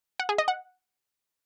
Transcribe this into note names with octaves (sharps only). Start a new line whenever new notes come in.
F#5
G#4
D#5
F#5